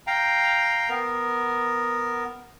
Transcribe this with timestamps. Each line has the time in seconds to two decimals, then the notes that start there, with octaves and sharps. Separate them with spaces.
0.07 F5 G5 A#5
0.89 B3 A#4